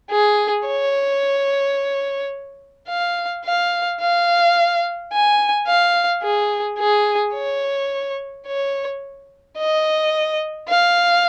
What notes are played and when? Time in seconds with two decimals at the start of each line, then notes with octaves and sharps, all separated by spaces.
0.11 G#4
0.67 C#5
2.89 F5
3.46 F5
4.01 F5
5.13 G#5
5.67 F5
6.23 G#4
6.79 G#4
7.34 C#5
8.47 C#5
9.58 D#5
10.69 F5